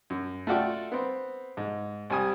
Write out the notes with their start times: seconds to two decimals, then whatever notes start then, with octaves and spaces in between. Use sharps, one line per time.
0.10 F#2
0.47 A3 F4 F#4 A4 D5 G5
0.92 B3 C4
1.57 G#2
2.10 C2 G3 G#5 D#6